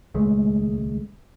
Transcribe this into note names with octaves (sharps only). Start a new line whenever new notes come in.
D#1 C#2 G#3 A3